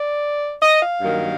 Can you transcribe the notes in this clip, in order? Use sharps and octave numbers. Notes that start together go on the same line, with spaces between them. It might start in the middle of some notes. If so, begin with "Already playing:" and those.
Already playing: D5
D#5
F5
G2 D#3 F#3 A#3